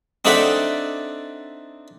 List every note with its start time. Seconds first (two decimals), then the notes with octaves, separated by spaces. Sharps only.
0.25 C4 D4 D#4 A4 E5 F#5